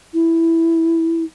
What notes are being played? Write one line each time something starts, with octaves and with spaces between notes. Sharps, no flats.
E4